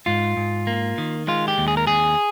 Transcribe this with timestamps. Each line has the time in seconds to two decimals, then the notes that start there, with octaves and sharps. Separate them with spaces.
0.06 G#2 F4
0.37 G#2
0.67 A#3
0.98 D#3
1.28 G#3 F4
1.48 G4
1.58 D#2
1.68 G#4
1.77 A#4
1.87 D#2 G#4